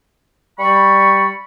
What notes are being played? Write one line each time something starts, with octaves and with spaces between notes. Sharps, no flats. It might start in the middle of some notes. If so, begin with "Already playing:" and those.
G3 B5 C#6